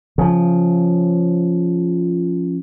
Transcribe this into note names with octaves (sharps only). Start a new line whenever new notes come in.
C#3 F3